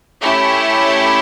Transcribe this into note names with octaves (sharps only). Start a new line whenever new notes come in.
A3 C#4 E4 G4